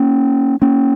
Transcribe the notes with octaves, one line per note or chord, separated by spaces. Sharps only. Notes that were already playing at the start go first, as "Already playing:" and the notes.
Already playing: A#3 C#4
A#3 C#4